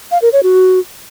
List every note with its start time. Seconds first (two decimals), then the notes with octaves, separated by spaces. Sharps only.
0.11 F5
0.22 A#4
0.33 C#5
0.43 F#4